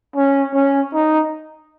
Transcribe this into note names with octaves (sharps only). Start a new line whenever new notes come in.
C#4
C#4
D#4